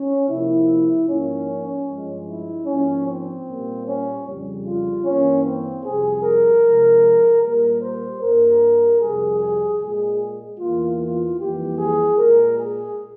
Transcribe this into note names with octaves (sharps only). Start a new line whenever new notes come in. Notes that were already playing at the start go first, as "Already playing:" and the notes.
Already playing: C#4
C3 F3 A#3 E4
G#2 F3 A#3 C#4
G2 F3 G#3
E4
G#2 F3 A#3 C#4
C4
A#2 G3 A#3
C#4
F2 C#3 G3
F4
G2 E3 A#3 C#4
C4
F2 C3 G3 G#4
A#4
C3 F3 G#3
A#2 G3 A#3 A#4
C5
G2 G3 A#3 A#4
F2 C3 G3 G#4
G#4
A#2 G#3 G#4
E2 E3 A#3 F4
F4
F2 E3 G3 A#3 G4
G#4
A#2 G#3 A#4
G#4